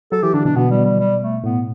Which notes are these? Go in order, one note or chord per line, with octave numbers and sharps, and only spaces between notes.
F#3 A4
E3 G4
D3 D4
B2 D4
B2 B3
G3
G3
G3
A3
A2 B3